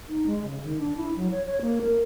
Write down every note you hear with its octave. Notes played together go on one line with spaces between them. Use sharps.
D#4
G#3
C#3
D#3
D4
E4
F#3
C#5
C#5
A#3
A#4